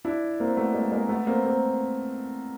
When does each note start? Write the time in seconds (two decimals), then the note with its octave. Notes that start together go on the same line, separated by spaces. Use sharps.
0.05 D4 E4
0.40 A#3 C4
0.57 A3 B3
0.74 G#3 A#3
0.92 G#3 A#3
1.09 A3 B3
1.27 A#3 C4
1.45 A#3 C4